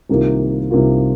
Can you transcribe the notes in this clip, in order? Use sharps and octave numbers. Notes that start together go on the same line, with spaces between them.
C2 C3 D#3 A#3 F4
C2 C3 D#3 A#3 F4